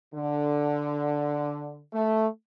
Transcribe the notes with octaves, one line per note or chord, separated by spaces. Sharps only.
D3
A3